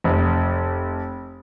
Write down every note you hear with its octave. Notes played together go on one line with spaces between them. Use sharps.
F1